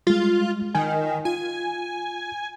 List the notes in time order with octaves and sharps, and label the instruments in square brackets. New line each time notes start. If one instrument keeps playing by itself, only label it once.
[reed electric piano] G3 G#3 [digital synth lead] F4
[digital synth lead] D#3 [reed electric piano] G#5
[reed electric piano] F4 [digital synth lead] G#5